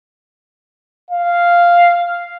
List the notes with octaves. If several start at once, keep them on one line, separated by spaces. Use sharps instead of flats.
F5